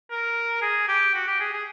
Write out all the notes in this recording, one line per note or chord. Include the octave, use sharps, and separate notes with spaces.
A#4
G#4
G4
F#4
G4
G#4
G#4